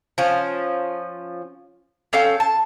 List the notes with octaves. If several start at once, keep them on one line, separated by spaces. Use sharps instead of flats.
F3 C#4
C#4 A4 F5 G5
A5